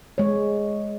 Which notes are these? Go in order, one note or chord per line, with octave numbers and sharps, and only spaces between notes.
G#3 C#5